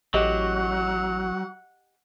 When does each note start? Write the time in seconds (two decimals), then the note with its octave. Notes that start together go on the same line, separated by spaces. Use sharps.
0.14 A1 F#3 G4 D#5 F#5